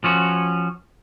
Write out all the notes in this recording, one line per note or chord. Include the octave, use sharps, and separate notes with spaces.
F3 C#4 F#4